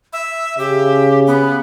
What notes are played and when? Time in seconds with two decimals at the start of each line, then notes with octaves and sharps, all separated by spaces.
0.13 E5
0.58 C#3 G4
1.27 B3